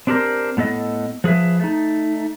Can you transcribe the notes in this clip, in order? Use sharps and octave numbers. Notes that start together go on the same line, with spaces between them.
C4 D4 G4 A4 A#4 C5
A2 B3 A4 D#5
F3 G#4 B4 E5
A3 D#4